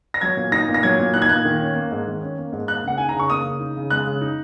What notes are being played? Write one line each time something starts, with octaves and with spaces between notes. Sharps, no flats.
A#6
F#3 G#6
A#2
D#4 A#6
A#2
A#6
F#3 G#6
A#2
D#4 F#6
G#6
A#2 F#6
D#3
C#4
A#3
G#2
D#3
C#4
A#3
G#2
A#3 F#6
C#3 F#5
D#4 G#5
A#5
C#3
C#6
A#3 D#6
C#3
D#4
C#3
G#3 F#6
C#3
D#4